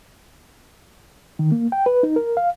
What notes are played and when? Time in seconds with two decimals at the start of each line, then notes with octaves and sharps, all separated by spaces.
1.39 D#3
1.52 A#3
1.72 G5
1.86 B4
2.03 D#4
2.16 A#4
2.37 F5